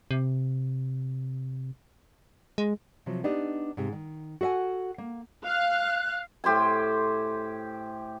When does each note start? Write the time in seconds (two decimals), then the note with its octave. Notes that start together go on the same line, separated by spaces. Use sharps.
0.11 C3
2.58 G#3
3.06 C3 F3 F#3
3.24 B3 D4 D#4 G4 D#5
3.77 G#2 C3
3.92 D#3
4.41 F#4 A4 E5 F#5 G#5
4.98 A#3
5.44 F5 F#6
6.44 A2 G4 C5 G#5